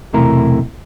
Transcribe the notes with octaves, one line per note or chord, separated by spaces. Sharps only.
B1 E2 C3 A3 E4 A#4